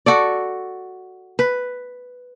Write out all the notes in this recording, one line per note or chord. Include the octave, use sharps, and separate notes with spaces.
F#4 A4 D5
B4